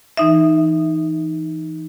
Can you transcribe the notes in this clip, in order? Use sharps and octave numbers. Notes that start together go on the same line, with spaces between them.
E3 D#4 E5